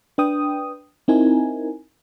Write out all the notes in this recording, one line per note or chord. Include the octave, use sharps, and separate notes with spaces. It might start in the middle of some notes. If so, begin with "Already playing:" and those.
D4 B4 G5 D#6
C4 D#4 E4 A#4 G#5